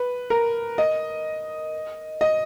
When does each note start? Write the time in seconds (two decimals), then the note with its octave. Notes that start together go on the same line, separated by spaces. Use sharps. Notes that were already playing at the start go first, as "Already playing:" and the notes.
Already playing: B4
0.30 A#4
0.78 D#5
2.21 D#5